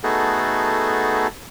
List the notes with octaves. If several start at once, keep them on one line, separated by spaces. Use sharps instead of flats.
A3 B3 D#4 F#4 G#4 A4